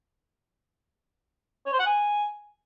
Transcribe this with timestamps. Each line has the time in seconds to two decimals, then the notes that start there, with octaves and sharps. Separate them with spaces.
1.66 C#5
1.73 C5
1.79 F#5
1.86 G#5